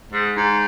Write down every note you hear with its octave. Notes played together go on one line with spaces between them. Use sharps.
G#2
G#2